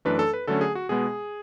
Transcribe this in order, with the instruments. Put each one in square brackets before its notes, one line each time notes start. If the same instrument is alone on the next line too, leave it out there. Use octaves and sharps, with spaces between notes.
[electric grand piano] F#2 E3 A3 D4 B4
A4
B4
D3 F#3 A3 C#4 A4
G#4
F#4
B2 G#3 B3 G#4